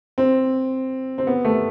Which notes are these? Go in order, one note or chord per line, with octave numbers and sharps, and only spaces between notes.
C4
C4
B3
A3